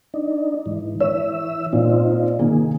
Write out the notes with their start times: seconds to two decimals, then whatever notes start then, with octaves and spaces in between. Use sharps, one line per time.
0.14 D4 D#4
0.66 G#2 E3
1.00 E3 C#5 E5 E6
1.73 A#2 C4 D#4 F4
2.39 C3 D#3 A#3 G#4